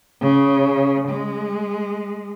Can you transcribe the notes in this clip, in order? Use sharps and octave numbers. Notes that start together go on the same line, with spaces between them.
C#3
G#3